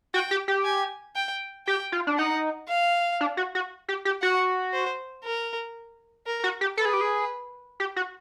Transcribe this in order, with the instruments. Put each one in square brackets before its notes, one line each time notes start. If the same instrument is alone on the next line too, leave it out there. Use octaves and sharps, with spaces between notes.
[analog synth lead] F#4 [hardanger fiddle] G5
[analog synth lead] G4
G4
[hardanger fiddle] G#5
G5
[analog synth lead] G4 [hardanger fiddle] G5
[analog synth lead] F4
D4
[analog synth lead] D#4 [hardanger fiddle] F#5
[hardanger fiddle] F5
[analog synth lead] D4
F#4
F#4
G4
G4
[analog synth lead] F#4 [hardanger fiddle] F#5
[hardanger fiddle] C5
A#4
A#4
[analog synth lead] F#4
G4
[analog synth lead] A4 [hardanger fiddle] B4
[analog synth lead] G#4
G4
G#4
G4
F#4